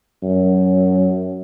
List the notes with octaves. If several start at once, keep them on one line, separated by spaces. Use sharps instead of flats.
F#2